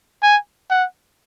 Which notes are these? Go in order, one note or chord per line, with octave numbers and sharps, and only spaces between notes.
G#5
F#5